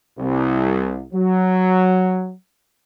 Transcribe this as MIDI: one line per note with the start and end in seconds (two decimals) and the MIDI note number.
0.18 1.03 36
1.13 2.34 54